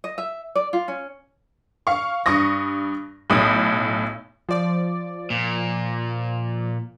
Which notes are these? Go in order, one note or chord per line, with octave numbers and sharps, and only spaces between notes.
D#5
E5
D5
F4
C#4
F5 C#6
G2 C#6 D#6 A#6
B1 A2 D#6
F3 D5
A#2